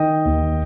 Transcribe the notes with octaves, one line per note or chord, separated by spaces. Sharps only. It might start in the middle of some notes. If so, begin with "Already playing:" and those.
Already playing: D#3 D#5 G5
D#2